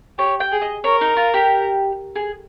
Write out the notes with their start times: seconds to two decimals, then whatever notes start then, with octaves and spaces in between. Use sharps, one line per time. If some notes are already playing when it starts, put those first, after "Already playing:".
0.18 G4 C#5
0.40 G5
0.52 G#4
0.62 D#5
0.84 A#4 C#5
1.01 D#4
1.17 F4
1.34 G4
2.16 G#4